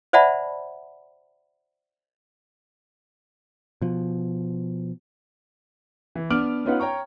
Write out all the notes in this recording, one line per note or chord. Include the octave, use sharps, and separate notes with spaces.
C5 D5 E5 F#5 A5 B5
B2 F3
E3
B3 D4 D6 F6 D7 F#7
B3 C#4 D#4 F4 B4 F#5
C#5 G5 A#5 C#6